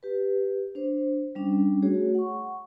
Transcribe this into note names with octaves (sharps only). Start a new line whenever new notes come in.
G4 B4
D4 C5
G3 C#4 D4
A3 F#4 G#4 C#5
F#5 C#6